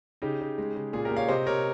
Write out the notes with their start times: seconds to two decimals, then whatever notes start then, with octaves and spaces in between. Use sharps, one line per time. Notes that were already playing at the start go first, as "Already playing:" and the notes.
0.22 C#3 D#4 G4
0.41 C#3
0.58 G#3
0.75 C#3
0.93 A#2 F4 G#4
1.05 G4 A#4
1.11 A#2
1.17 C#5 F5
1.28 C3 C5 D#5
1.46 C3 A#4 C#5